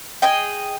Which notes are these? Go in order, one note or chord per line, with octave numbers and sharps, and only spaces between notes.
G#4 D#5 G5